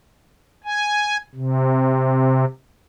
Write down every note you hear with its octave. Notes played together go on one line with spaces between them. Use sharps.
G#5
C3